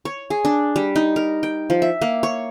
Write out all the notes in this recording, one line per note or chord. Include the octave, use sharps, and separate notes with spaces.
C#5
G#4
D4
G3
D#4
A#4
G5
F3
E5
A#3
C#5